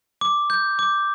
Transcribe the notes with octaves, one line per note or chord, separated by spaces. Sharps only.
D6
G6
D6